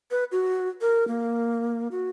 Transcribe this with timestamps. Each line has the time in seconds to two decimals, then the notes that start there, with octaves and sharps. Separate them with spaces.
0.11 B4
0.32 F#4
0.81 A#4
1.08 A#3
1.91 F#4